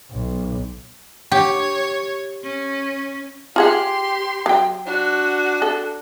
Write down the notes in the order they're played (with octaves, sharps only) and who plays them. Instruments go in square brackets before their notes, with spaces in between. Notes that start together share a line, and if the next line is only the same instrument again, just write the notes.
[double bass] B1
[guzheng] G4 [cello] C#5
[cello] C#4
[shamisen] F4 G#4 F#5 [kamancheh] G4 C6
[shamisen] F#3 G5
[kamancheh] D4 F#4
[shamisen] A4